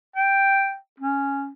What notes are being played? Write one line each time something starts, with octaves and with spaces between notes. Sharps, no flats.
G5
C#4